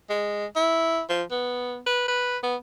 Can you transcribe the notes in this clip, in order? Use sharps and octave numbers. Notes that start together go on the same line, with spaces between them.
G#3
E4
F3
B3
B4
B4
B3